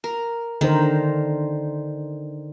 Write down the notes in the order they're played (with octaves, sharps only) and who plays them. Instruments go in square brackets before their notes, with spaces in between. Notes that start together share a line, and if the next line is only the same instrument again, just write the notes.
[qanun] A#4
[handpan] D3 A#4 C5 [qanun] D#3